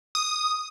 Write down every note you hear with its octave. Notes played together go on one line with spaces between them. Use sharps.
D#6